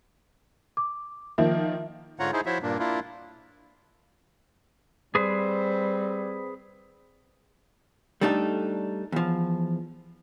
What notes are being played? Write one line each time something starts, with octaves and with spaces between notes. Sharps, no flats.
D6
D#3 F3 A#3 E5
G#2 D3 F4 C#5 F#5 A#5
D#4 E4 G#4 C5
F3 E4 F#4 C5 C#5 E5
G2 A#2 A#3 D4
A#3 D4 E4 F4
G3 C4 G#4 B4 C5
G3 A3 D4 D#4 A4
E2 F3